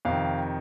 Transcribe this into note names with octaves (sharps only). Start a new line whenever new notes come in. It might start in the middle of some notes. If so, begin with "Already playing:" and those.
F2 C3 D#3 F5